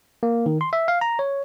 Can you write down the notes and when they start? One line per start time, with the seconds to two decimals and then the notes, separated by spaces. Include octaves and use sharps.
0.23 A#3
0.46 D#3
0.61 C6
0.73 E5
0.88 F5
1.01 A#5
1.19 C#5